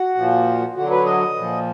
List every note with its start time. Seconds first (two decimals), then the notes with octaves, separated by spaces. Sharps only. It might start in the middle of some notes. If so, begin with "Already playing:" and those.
Already playing: F#4
0.15 A#2 F3
0.75 D3 F#3 F#4
0.90 B4
1.05 D#5
1.36 A#2 F3